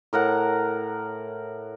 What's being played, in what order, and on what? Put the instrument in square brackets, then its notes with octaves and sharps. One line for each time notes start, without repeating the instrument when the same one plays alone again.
[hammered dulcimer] A2 A#4 F#5